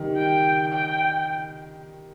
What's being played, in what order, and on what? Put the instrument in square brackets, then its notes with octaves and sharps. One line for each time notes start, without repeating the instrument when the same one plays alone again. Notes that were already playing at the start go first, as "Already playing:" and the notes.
Already playing: [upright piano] D#3 G3
[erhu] G5
G5